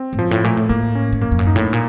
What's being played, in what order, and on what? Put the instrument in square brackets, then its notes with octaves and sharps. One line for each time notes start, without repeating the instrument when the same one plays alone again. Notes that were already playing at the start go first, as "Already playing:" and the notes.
Already playing: [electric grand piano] C4
[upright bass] A2
[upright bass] F#2 [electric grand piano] F3
[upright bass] A2
[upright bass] A#2 [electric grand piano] A3
[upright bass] A2
[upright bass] A2 [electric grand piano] A#3
[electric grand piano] C#4
[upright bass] A2
[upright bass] F#2 [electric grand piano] A#3
[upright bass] F2
F#2
[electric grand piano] D#4
[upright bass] A2
[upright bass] A#2 [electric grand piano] A#3